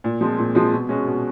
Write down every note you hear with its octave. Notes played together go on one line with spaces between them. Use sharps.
A#2
F3 G#3 C4
A#2
F3 G#3 C4
B2
G#3 C#4 F#4
B2